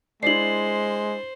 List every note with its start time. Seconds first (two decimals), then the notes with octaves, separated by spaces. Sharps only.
0.23 G#3 D4 E4 C5 C7 F#7